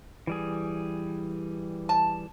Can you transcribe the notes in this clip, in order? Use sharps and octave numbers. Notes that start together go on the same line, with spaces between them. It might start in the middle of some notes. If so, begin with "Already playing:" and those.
E3 G3 G#4
A5